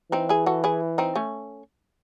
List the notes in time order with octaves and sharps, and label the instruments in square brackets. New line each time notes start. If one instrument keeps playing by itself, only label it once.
[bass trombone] E3 [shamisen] C4 D#4
[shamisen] E4 G#4
F#4 A4
E4 G#4
C4 D#4
A3 C#4